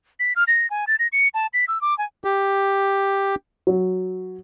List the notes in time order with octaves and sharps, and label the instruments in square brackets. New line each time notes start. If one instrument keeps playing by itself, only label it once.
[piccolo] B6
F6
A#6
G#5
A6
A#6
C#7
A5
B6
E6
D6
G#5
[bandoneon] G4
[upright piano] F#3